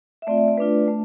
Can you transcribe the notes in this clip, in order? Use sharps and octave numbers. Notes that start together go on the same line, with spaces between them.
E5
A3 C4 F4 D5
E5
D5
A3 D4 F4 B4
A3 D4